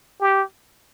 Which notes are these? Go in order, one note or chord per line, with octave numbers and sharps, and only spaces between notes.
G4